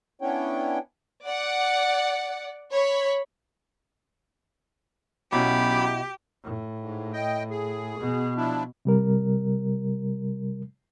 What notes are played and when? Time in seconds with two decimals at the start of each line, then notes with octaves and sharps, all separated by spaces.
0.21 B3 C#4 D4 E4 C#5 G5
1.25 D5 F#5
2.72 C#5 B5
5.32 B1 B2 F#3 C#4 E4 G4 B5 D6
6.43 A2
6.80 G#2
7.13 D#5 G5
7.50 G#4
7.99 B2
8.36 F3 D4 E4
8.85 C3 G3 A#4